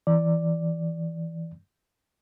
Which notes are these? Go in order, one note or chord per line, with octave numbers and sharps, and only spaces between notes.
E3 D5